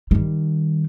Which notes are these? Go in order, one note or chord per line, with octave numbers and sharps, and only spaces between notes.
D#3 G3